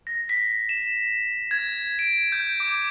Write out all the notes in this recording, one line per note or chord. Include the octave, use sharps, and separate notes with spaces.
A#6
B6
E7
G#6
D7
G6
D6